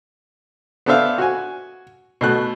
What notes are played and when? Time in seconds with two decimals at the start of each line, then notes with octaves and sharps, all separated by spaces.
0.86 B3 D4 A4 C5 E5 F5
1.18 F#4 G#5
2.21 B2 A3 F#6